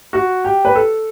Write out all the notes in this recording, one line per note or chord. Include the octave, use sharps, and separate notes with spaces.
F#4
G4
B4
A4